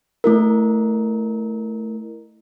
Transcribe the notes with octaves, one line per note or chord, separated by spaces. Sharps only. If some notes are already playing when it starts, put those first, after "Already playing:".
A3 E4 A#4